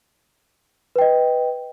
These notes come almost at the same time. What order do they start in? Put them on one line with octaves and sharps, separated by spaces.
B4 G5 D#5